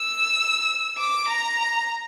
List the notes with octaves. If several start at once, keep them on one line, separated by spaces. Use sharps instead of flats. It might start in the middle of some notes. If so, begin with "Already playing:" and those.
Already playing: E6
D6
A#5